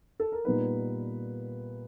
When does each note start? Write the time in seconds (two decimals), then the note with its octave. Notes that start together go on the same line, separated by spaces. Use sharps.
0.20 A4
0.32 A#4
0.45 A#2 G3 B3 D#4 B4